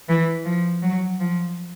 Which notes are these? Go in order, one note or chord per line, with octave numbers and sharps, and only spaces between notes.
E3
F3
F#3
F3